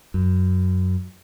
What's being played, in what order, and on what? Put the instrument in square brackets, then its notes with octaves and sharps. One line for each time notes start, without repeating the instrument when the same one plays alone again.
[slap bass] F#2